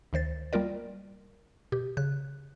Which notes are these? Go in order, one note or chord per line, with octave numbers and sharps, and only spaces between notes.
D2 D#3 C5 A6
G3 A#3 F4 A#4 D5
B2 G4
C#3 F#6